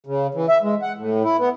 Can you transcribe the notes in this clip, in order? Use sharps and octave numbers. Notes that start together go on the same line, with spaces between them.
C#3
E3
E5
G#3
F#5
A2
E4
B3